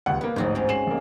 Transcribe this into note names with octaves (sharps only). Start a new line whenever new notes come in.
D#1 C#2 F#5
A#3 B3 B4
A1 D2 G#2 D#4 F#4 C5
C4 C#4
G#3 C7 E7 F#7
A1 A#3